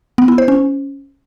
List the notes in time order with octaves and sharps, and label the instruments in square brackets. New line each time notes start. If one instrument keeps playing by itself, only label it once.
[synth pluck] B3
E4
C5
C#4